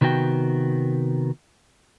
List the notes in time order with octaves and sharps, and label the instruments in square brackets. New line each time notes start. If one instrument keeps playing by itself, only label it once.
[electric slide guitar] C3 D#3 B3 F#4 G5